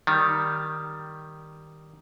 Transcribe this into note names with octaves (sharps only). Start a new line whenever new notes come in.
D#3 G3